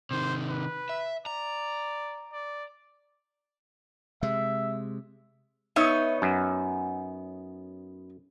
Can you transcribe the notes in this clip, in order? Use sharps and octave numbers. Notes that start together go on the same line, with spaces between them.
C3 D#3 C5
B4
E5
D5 A#5
D5
C3 G#3 E5
B3 D#4 C#5 E5
F#2